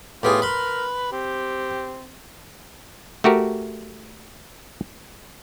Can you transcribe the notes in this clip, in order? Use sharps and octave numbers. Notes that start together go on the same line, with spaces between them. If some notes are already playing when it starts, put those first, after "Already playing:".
A2 B3 F4 G4 G#4
A#4 B4 B5 C6
C4 G4
A3 F#4 G4 A#4